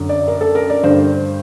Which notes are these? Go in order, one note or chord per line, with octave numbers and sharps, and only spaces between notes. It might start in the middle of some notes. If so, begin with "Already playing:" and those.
Already playing: F#2 D3
D5
A#4
A4
A#4
D5
G2 D3 C5